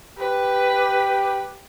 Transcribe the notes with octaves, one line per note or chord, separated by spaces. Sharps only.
G4 B4